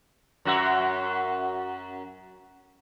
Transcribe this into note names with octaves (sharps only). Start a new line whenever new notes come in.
F#2 F#4 E5